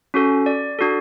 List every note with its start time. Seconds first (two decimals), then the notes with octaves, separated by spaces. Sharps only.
0.14 C#4 F#4 A4
0.46 D5
0.79 D4 F#4 A4